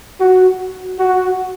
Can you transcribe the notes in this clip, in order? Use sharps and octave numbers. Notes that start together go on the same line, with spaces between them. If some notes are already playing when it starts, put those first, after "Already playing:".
F#4
F#4